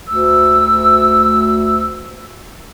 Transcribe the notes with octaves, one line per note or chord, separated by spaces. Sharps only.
D2 E6